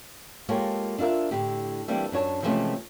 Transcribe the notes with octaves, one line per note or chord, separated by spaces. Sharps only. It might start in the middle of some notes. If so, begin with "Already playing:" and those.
G#3 A#3 F4 G4 A4 C#5
D4 E4 F4 A#4 E5
A2 D3 G4
E3 G3 A#3 C4 D4 E4
F#2 D4 C#5 A5
C3 E3 F3 G#3 A3 C#4